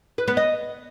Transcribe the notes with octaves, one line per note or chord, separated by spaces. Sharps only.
B4
B3
D#5